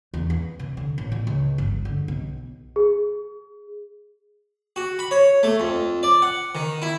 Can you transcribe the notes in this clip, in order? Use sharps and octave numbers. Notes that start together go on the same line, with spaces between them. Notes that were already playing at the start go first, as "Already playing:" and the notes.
E2
B3
C3
D3
A1
A#2
C#2
G1
D3
B1
G#4
F#4
B5
C#5
A3
F2
D5
F#5
D#3
E4